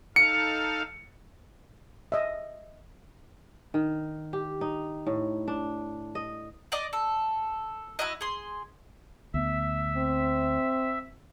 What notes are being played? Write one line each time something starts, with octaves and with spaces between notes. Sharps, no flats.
D#4 A4 F5 C#7
D#5 E5
D#3
G4
D#4
A2
D4
D#5
D5 D#5 D6
A4
E4 F#4 D#5
G#4 C6
D2 B3 E5
C4